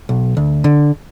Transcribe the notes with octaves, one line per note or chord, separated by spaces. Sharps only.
B1
D2
D3